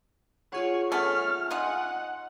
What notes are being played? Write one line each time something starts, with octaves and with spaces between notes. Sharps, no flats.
F4 G#4 C#5 F#5
A3 B3 C#4 F6
D#4 F4 D#5 F#5 G#5 C6